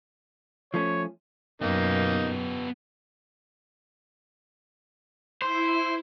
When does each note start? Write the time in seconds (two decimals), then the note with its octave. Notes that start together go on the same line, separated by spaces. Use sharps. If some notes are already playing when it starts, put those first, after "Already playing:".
0.74 F3 A3 C#4 C#5
1.62 F#2 B2 A#3 B3 D#4 G4
5.42 E4 C5